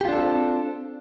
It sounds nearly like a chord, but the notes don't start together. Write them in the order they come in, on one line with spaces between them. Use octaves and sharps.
G4 F4 D4 A4 C4